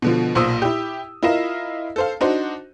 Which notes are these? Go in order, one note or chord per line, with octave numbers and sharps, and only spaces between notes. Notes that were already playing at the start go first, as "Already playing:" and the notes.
B2 D3 F3
B1 A#2 C5 D#6 E6
E4 G4
E4 F4 A#4 D#5 F5 E7
A4 C5 F5
D4 D#4 F#4 C5